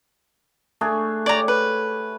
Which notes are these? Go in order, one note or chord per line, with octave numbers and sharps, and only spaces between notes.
A3 D4 G#4
G4 C#5 D5 A#5
B4